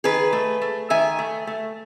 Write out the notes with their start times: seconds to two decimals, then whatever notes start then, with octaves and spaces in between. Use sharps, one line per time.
0.04 D#3 G#4 B4
0.33 A3
0.62 A3
0.90 D#3 E5 G#5
1.19 A3
1.47 A3